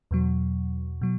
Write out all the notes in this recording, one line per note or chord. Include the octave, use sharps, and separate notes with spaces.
E2 B2 F#3
B2 F#3